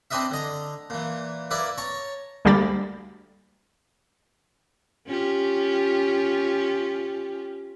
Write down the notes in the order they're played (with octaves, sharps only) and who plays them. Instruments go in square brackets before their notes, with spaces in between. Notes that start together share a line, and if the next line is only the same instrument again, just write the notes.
[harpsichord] C4 D4 B4 D#5 E5
D3 D#5 A#5
A#2 E3
A#3 E4 B4 D5
C#5 A5 A#5
[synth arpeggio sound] D2 G3 A#3 G4 B5 A6
[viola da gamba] C#4 F4 G4